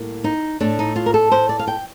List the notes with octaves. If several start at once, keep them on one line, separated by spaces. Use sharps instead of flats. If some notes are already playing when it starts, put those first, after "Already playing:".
Already playing: A2 G3 A#3
D#4
A2 A3 D4
D#4
F4
A#4
A4
C5
D5
F5
G5